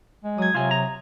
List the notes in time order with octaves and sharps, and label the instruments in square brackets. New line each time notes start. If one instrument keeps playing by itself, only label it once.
[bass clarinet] G#3
[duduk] F#3 [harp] D#6 G#6
[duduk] C3 [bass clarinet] F#3 [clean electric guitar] F4 G#5
[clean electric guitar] A#5